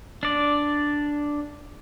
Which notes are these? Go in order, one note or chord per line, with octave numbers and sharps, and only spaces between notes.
D4 D5